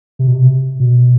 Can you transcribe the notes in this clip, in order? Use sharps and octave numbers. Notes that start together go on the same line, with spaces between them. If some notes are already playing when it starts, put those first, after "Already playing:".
C3
B2
C3
B2